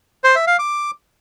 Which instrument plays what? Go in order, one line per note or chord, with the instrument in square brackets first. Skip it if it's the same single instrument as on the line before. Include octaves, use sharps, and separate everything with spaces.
[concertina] C5
E5
F5
D6